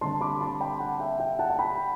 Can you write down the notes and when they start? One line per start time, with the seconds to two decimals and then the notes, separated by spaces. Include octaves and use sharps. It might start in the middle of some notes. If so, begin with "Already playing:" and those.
0.01 D3 G3 C4 A5 C6
0.21 B5 D6
0.41 A5 C6
0.61 G5 B5
0.80 F#5 A5
1.00 E5 G5
1.20 E5 G5
1.39 F#5 A5
1.50 A5
1.59 G5 B5